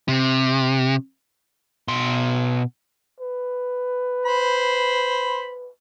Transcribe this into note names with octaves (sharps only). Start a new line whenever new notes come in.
C3
B2 C6
B4
C5 B5